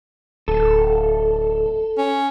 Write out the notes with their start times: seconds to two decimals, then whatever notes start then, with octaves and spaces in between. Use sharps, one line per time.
0.48 D1 A4
1.97 C#4